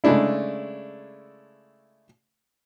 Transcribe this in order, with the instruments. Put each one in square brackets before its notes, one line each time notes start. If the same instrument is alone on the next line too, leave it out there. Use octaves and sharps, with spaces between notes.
[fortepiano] C#3 G#3 A3 D4 E4